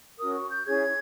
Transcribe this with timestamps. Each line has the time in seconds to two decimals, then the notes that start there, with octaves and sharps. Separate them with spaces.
0.18 C#4 F#4 A#4 D#6
0.35 C#6
0.51 G6
0.67 C#4 E4 G#4 C#5 G#6